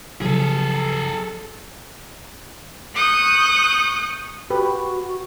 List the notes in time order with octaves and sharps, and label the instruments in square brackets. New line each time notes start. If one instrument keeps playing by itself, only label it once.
[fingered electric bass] C#3 F3 F#3 [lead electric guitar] G#4 A4
[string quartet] C#6 D#6 F#6 G6
[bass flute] F#4 [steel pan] G4 B4